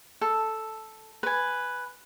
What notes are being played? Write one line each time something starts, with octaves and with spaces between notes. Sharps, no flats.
A4
B4 G#5